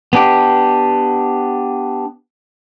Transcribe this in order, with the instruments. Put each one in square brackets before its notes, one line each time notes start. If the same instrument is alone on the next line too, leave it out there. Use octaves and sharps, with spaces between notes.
[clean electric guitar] B3 D4 G4